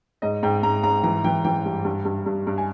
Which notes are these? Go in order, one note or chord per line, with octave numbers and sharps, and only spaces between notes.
G#2 D#5
G#2 G5
G#2 A#5
G#2 A#5
E3 A#5
E3 G5
E3 G5
G2
G2
G2
G2
G2
G#5